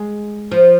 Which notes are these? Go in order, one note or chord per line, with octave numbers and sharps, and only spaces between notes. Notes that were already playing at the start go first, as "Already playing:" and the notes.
Already playing: G#3
F3